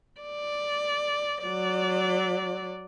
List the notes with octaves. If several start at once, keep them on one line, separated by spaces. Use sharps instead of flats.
D5
F#3 D5